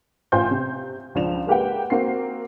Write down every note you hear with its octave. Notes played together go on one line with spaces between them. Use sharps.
A1 F4 C5 G5 G#5 G6
C3
C#2 F3 D4 E7 F7
G#3 A#3 G4 B4 F#5 G5
A#3 C4 F#4 C7